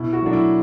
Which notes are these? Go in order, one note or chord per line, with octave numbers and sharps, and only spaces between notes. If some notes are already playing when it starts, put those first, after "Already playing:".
Already playing: B2 E4
F#4
F#3 A3 D4
E4